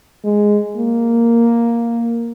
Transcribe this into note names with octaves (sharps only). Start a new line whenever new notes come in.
G#3
A#3